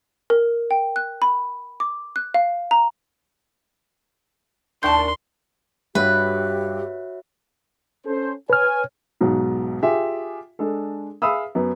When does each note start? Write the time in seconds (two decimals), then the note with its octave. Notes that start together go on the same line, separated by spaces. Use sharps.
0.30 A#4
0.71 G5
0.96 F#6
1.22 B5
1.80 D6
2.16 F#6
2.34 F5
2.71 A#5
4.83 D#2 A2 D4 A#4 A5 C6 G6
5.95 G2 F#4 G4 B4 C#5 E5
8.05 C#4 A4 C5
8.50 B4 C#5 G#5 F6
9.21 B1 G#2 B2
9.83 F4 G4 G#4 E5
10.59 G#3 D4 A4
11.22 G#4 E5 F5 B5 D#6 E6
11.55 F#2 B3